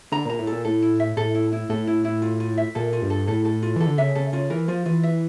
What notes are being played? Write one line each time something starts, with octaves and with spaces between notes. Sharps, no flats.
D3 A#5
A#2 A#5
A2
A#2 A4
A2 A4
E4
E5
A2 A4
E4
E4
A2 A4
E4
E4
F4
F4
E5
A#2 A4
F4
G2
A4
A2 A4
A4
F4
E3 A4
D3
C#3 E5
C#3 A4
C#3 F4
E3 A#4
F3 F4
E3 F4
E5